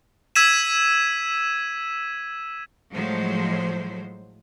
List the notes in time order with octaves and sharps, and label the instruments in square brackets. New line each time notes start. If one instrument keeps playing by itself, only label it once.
[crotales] E6 G#6 B6 D#7 E7
[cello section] A2 F3 F#3 G#3 C5